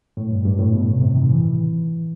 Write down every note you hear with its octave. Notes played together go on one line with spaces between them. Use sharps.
A2
G2
G2
A2
B2
C3
C3
D#3
E3